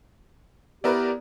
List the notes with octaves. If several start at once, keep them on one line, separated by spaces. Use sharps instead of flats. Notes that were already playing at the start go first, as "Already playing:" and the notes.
B3 E4 G4 A#4 B4 D5